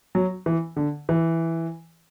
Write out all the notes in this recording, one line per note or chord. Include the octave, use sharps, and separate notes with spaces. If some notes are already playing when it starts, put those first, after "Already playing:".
F#3
E3
D3
E3